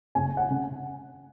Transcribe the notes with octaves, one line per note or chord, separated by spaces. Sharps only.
F#1 G#5
F#5
C#3